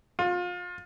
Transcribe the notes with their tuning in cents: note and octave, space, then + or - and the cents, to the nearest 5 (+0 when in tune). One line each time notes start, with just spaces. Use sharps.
F4 +30